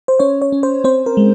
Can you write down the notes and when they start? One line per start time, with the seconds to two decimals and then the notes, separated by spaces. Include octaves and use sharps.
0.08 C5
0.19 C#4 C#5
0.42 C#5
0.52 C#4
0.63 C5
0.84 C4 C5
1.06 A#4
1.17 G#3